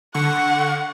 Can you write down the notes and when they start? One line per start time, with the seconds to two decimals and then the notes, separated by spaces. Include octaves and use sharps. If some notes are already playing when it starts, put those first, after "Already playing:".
0.14 D3 F#5 C#6